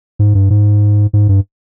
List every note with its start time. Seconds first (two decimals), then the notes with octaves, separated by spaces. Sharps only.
0.19 G#2
0.35 G2
0.50 G#2
1.13 G#2
1.29 G2